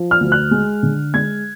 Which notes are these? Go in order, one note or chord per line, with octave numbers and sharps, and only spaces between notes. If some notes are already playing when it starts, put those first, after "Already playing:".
Already playing: F3
F6
D2
F#6
G#3
D3
G#3 G#6